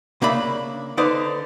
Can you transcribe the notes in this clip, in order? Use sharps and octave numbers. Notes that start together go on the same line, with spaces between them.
C#3 A#3 D4 E5 B5
D3 D#4 B4 C5 D5